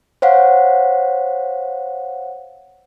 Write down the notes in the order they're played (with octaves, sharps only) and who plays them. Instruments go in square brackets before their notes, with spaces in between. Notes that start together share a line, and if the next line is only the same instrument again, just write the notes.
[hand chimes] C5 C#5 F5 F#5